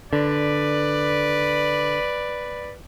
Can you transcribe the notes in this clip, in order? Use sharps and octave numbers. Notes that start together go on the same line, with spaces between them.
D3 B4 D5